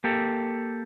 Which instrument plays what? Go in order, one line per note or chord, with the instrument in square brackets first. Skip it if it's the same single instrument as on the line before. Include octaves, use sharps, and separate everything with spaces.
[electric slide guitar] A#3 G4 A4